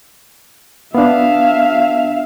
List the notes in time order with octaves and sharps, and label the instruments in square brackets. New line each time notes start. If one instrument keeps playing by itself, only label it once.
[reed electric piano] B3 D4 [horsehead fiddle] E5 F5